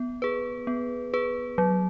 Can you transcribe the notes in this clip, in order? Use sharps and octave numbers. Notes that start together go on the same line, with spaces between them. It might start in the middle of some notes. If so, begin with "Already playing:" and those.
Already playing: B3
G#4 B4
B3
G#4 B4
F#3